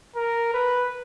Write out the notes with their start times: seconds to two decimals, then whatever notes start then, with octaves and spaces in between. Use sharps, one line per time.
0.16 A#4
0.54 B4